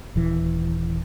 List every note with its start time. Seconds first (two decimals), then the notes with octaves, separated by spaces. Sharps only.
0.16 D#1 E3